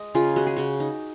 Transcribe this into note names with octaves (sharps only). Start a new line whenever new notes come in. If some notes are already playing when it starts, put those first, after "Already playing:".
Already playing: G#3 D#5
C#3 F4 G#4
G#3 F#4
G#4
C#3 F#4
D#4